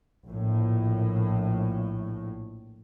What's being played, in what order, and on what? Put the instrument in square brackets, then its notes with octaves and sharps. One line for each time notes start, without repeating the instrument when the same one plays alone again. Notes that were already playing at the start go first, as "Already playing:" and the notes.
[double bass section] A#1 A2